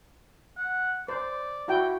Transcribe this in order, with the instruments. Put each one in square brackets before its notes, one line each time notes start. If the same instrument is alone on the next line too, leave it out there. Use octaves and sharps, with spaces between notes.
[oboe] F#5
[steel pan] C5 [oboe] D5
[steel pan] E4 F#4 G5